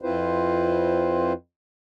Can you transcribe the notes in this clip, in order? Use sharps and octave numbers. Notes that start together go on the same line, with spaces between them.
F2 C4 E4 F4 B4 C5